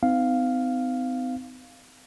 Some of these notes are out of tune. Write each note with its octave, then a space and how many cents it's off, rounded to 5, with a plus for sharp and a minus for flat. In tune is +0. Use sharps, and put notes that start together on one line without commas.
C4 -45 D#4 +0 F5 +0